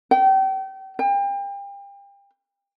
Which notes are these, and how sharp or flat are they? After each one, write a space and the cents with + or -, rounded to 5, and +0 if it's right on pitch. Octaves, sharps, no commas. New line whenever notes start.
G5 -35
G5 +35